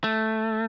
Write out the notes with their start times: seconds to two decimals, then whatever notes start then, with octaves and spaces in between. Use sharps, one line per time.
0.04 A3